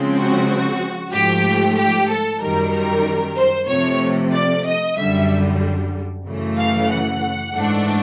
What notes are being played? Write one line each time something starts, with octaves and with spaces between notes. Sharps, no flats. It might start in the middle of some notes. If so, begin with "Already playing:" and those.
Already playing: C#3 F3 G#3 C4
F#4
G#2 F3 A3 G4
G4
A4
F#2 D#3 G3 A#4
C5
C3 F3 A3 C#5
D5
D#5
F#2 D3 G3 E5
F#2 C#3 E3 A3
F5
F#5
G#2 E3 A3 D4